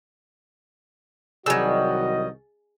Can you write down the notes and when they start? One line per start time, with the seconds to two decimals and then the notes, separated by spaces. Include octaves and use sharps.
1.46 C2 D#3 F#3 G3 F#4 G#4 D#5 E6